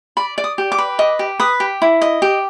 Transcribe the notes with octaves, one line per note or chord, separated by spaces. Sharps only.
D5 B5
D5
D#6
G4
D6
B4
D#5 D6
G4
B4 D#6
G4
E4
D#5
G4